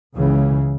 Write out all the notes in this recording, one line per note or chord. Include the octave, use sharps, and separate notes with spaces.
C#2 C#3 E3